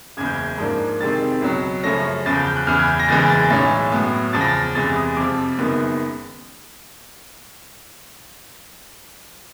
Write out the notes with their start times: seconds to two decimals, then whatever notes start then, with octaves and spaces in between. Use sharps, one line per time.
0.17 F#1 E2 C#3 G#6
0.26 G6
0.35 G#6
0.58 G#2 F3 A#3 D4
1.00 F2 C3 D#3 G#3 C4 A6
1.42 C#2 B2 F#3
1.83 F#2 C#3 F3 A3 C#4 A#6
2.26 E2 C#3 F3 A6
2.36 G6
2.47 G6
2.56 F#6
2.67 E2 C#3 E3 F6
2.79 G#6
2.88 G6
3.00 A#6
3.09 F#1 E2 C#3 E3 G#3 A6
3.30 A6
3.50 B1 A2 E3 G#3 C#4 A6
3.92 A2 F#3 B3
4.33 E2 C#3 F3 A6
4.41 A#6
4.48 A6
4.75 E2 C3 E3 G#3 A6
4.96 D#6
5.16 F2 C3 F3 D6
5.58 F#1 F#2 D#3 G#3 B3